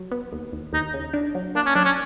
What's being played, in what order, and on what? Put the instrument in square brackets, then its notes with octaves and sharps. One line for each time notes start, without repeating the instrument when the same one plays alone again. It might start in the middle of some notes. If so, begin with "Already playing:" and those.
Already playing: [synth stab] F#3
B3
D#2
D#2
[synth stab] D#2 [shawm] D#4
[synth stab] C#3
D4
F#3
[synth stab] A#3 [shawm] D4
[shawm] C#4
[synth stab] F#3 [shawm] D4
[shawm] C#4